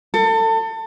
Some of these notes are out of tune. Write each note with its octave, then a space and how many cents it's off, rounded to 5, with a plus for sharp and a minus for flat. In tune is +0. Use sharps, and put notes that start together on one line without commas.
A4 +30